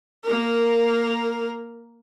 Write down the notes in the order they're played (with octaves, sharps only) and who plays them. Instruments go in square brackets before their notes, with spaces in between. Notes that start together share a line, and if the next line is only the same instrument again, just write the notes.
[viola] A#3 A#4